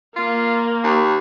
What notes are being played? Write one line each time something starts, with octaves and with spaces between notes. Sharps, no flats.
A#3 F4
D#2